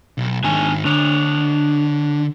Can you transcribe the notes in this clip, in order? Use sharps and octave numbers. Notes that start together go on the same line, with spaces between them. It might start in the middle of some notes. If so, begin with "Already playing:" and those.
B1
G#2 D#3 D4 G#5
D3 D4 C#5